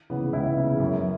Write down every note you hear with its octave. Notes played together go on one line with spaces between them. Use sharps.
C#3 E3 B3
C#2 E4
C#3 E3 B3
F#2